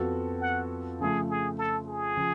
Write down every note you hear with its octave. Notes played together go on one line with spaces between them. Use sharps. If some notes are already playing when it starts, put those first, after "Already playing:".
Already playing: F2 F3 B3 F#4 A4
F#5
C#3 F3 A3 G#4
G#4
A4
G#4
C#3 F3